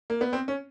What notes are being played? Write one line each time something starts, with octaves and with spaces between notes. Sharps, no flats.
A#3
B3
C4
C#4